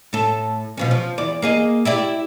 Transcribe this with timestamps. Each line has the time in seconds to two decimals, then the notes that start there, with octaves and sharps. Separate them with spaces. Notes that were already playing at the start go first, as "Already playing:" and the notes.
0.13 A2 A4
0.77 B2 F3 C#4
0.91 F3
1.18 E2 D5
1.42 A#3 G#4 D#5
1.85 E4 G4 D5